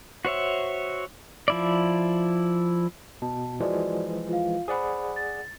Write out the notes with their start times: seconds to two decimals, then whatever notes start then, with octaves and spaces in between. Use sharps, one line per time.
0.25 F#4 C5 C#5 E5
1.48 F3 E4 D5
3.22 B2 A5
3.60 E3 F3 G#3 F#4 D5
4.29 F4 F5
4.68 G#4 C5 D5 F#5 B5
5.16 A6